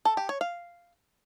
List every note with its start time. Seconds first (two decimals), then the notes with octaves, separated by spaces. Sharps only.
0.05 A4
0.17 G4
0.29 C#5
0.41 F5